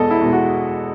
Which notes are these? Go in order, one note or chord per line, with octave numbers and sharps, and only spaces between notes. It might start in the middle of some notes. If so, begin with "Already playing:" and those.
Already playing: E2 B2 G#3 A4 D#5
E4
B2 G#3
F#4